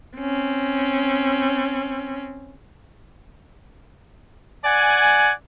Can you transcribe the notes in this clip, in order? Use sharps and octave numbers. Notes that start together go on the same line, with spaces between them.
C4 C#4
D5 F#5 G#5